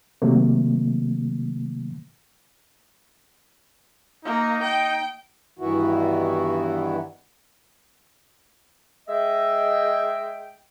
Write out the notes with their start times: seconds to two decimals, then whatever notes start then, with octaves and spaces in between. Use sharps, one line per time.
0.22 C3 D#3 F#3 A3 A#3
4.25 A#3 D#4
4.63 G5
5.59 G2 D#3 E3 B3 E4 F#4
9.08 G#3 D#5 E5 G5